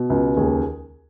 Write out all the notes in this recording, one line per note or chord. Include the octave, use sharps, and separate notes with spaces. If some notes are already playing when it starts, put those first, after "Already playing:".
Already playing: B2
C#2
D#2 G#4